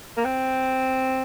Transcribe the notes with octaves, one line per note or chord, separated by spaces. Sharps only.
A#3
C4